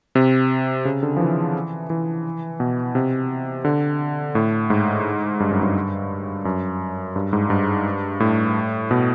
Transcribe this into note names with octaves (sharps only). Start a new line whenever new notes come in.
C3
C#3
D3
F3
E3
E3
B2
C3
D3
A2
G#2
G2
F#2
G2
F#2
G2
G#2
G2
A2
B2